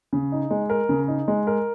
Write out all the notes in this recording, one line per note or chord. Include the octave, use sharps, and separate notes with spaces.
C#3
D#4
G#3
A#4
C#3
D#4
G#3
A#4